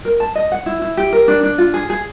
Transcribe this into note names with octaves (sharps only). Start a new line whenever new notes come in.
A#4
A5
D#5
F#5
E4
E4
G4
A#4
D4
D4
F4
G#4
G#4